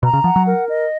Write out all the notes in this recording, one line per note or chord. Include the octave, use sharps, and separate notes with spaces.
B2 A#5
C#3
F3 F#5
F#3
A#4
D#5